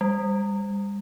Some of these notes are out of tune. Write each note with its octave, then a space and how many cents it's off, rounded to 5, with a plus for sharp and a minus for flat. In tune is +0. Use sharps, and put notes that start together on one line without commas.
G3 +35